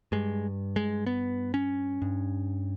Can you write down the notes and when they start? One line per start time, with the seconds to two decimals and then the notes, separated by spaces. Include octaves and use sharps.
0.12 G2 G#3
0.76 G#3
1.06 B3
1.54 C#4
2.02 G2